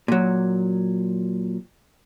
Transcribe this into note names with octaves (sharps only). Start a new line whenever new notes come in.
A#2 F#3